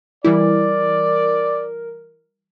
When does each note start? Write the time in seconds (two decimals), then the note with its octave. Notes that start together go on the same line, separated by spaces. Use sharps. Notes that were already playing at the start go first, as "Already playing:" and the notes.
0.24 E3 G3 E4 A#4 D5